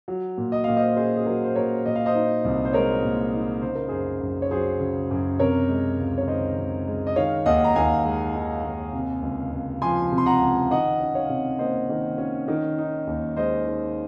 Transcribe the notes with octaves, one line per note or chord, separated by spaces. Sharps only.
F#3
A#2
D#5
A#2 F5
C5 D#5
C#4 G#4 C5
G#4
F#3 F#4 A#4
C5
A#2 A#4 C#5
A#2 D#5
F5
C5 D#5
D#4
C2
C5
G#3 A#4 C#5
A#2
D#4
C#3 C5
A#4
F#2 G#4 C5
F#2
C#5
F#3 G#4 C5
C#3
F#2
C3 A#4 C#5
G#3
C#2
C#5
D#3 C5 D#5
C3
G#3
D#5
D#3 C#5 F5
D#2 D#5 F#5
A#5
D#2 F5 G#5
G#3
D#3
D#2
C3
C#2
C#2
F3 G#5 C6
C3
C6
F#5 A#5
C#2
D#3 D#5 F#5
C#4
C#5 F5
C3
A#3 C5 D#5
D#3
C#4
D#3
D#4
D#2
G#3 C5 D#5
D#3